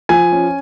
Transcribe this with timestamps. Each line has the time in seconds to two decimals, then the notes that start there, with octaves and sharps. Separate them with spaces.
0.09 F3 G#5
0.32 C#4